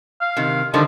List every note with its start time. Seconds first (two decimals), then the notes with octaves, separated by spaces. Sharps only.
0.21 F5
0.37 C3 D#3
0.74 D3 D#3 F3 G3